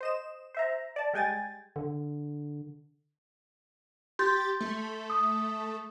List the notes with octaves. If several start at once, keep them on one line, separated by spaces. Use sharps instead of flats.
C5 D#5 E7
C5 E5 A#5
D5 A5
G3 G#3 G5 G#5 A6
D3
G4 C6 G6 A6
A3
D#6